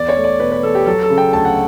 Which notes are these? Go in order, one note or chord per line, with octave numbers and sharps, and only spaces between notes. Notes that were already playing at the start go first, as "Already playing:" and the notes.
Already playing: E2 D5
C#5
A3
D5
B2 B4
B4
E2 A4
G4
F#3 A4
A4
C#3
G5
D2 A5
F#5